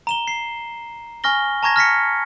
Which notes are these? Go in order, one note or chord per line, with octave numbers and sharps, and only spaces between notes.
A#5 E7 G7
C7
G#5 C#6 F6 A#6 G7
A5 A#5 C#6 G#6 A#6
F6 A#6 B6 C#7